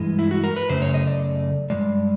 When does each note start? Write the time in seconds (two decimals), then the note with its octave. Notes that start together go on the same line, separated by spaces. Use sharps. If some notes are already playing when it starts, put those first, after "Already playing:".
Already playing: G2 E3 G#3
0.19 E4
0.31 F#4
0.44 A#4
0.56 B4
0.69 F#2 C#3 A3 C5
0.82 C#5
0.94 D#5
1.07 D5
1.70 G2 D#3 G#3 D5